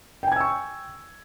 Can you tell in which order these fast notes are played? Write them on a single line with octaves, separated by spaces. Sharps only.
G5 G#5 G#6 E6 C#6